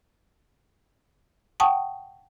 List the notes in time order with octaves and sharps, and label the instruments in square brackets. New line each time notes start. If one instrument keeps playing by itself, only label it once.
[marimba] F#5 G5 A5 C#6 D#6